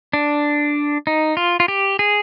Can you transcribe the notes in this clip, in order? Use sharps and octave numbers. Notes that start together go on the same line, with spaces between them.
D4
D#4
F4
F4
G4
G#4